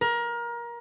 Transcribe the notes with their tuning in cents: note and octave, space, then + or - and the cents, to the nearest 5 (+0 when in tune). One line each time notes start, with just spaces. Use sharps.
A#4 +25